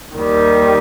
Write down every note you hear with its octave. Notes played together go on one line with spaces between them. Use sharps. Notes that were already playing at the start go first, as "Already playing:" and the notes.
D#2 D#3 G3